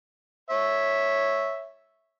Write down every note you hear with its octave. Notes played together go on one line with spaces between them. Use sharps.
C#5 E5